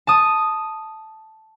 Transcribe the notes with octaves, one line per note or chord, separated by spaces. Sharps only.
A5 D#6